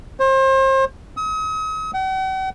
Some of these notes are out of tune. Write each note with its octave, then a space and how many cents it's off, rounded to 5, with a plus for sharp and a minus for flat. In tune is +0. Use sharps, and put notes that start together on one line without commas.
C5 +35
D#6 +40
F#5 +45